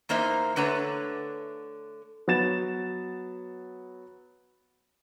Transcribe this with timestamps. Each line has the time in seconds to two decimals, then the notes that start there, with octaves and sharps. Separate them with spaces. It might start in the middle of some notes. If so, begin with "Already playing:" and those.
0.09 E2 A#3 D#4 C5 E5
0.56 D3 A3 B4 C#5 F#5 A#5
2.28 F#3 B3 A6 E7